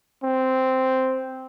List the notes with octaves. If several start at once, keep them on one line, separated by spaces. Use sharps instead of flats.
C4